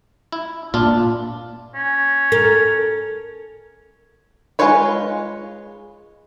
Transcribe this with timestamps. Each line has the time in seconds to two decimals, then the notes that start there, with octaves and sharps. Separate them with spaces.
0.32 E4
0.74 A#2 D4 F4
1.75 C#4
2.32 A4 A#4
4.59 G#3 F4 B4 C#5 B5